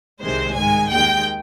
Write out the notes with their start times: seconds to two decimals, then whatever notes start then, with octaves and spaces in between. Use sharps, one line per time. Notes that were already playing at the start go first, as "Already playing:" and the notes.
0.21 C2 C3 D#3 G#3 C5
0.56 G#2 D#3 G#3 G#5
0.90 D#2 D#3 G#3 G5